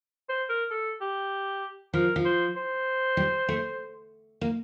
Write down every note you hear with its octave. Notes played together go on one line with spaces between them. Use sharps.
C5
A#4
A4
G4
F3 A#4
F3
C5
C5
G3
A3
A#3